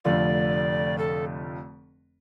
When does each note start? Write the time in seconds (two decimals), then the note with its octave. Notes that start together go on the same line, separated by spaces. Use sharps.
0.05 F1 F2 D3 A3 F4 D5
0.98 A4